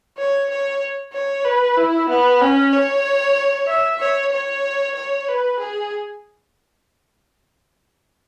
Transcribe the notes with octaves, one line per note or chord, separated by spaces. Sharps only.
C#5
C#5
C#5
B4
E4
B3
C#4
C#5
E5
C#5
C#5
C#5
B4
G#4